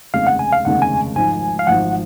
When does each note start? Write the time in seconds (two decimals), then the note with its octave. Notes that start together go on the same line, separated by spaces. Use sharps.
0.14 F1 D#2 C#3 G#3 C4 F5
0.27 F#5
0.39 G#5
0.52 F5
0.65 F1 D#2 C#3 G#3 C4 F#5
0.82 G#5
1.16 G#1 G#2 F3 G#5
1.59 F5
1.67 G#1 G#2 F3 F#5